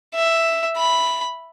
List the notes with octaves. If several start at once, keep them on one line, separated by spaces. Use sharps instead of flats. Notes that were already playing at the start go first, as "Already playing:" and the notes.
E5
B5